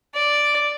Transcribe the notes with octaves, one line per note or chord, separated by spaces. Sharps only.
D5